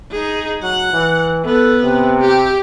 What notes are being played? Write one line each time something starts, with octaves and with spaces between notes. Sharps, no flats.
D#4 G#4
F#3 F#5
E3
B3 A4
C3
G4